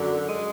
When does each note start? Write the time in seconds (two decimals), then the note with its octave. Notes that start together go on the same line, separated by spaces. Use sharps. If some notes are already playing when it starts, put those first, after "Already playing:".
Already playing: F#2 D3
0.28 G#3